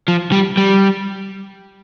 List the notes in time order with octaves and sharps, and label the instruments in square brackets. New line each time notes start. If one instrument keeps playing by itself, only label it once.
[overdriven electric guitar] F3
G3
G3